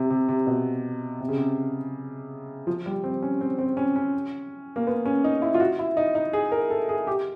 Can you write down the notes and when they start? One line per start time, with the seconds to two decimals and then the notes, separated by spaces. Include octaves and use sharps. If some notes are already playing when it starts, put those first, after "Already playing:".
Already playing: C3
0.11 C3
0.29 C3
0.47 B2
1.20 C3
1.29 C#3
1.37 C3
2.67 F3
2.86 G3
3.04 C4
3.22 C#4
3.41 C4
3.59 C4
3.77 C#4
3.96 C#4
4.76 A#3
4.87 B3
5.05 C#4
5.24 D#4
5.42 E4
5.54 F4
5.60 F#4
5.79 E4
5.97 D#4
6.15 D#4
6.33 G#4
6.52 A#4
6.70 A4
6.89 G#4
7.07 G4